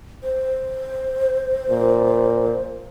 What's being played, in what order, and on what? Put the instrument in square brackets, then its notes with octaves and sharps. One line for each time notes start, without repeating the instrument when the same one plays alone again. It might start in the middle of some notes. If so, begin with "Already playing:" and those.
[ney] C5
[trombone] A#2